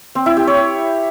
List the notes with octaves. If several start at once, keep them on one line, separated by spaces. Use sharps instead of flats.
C4
E4
G4
C#5